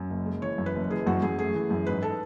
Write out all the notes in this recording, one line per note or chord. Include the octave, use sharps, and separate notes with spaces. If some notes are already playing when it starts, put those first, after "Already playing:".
Already playing: F#2
F#1
G#3
E3 C#5
F#2
B4
F#1
E3 G#4
F#2 F#4
F#2 G#4
A3 G#4
E3
F#2
G#2 B4
A4